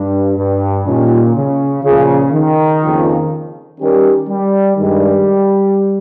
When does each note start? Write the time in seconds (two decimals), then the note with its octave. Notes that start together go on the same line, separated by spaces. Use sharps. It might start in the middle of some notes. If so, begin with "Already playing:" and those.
Already playing: G2
0.38 G2
0.86 A#2 D#3 G3 C#4 F4
1.35 C#3
1.84 A#2 C#3 F3 A#3 F4 G#4
2.33 D#3
2.82 F2 C#3 F3 A#3
3.79 D#3 G3 C#4 G4 A#4
4.29 G3
4.76 G2 D#3 G3 G#3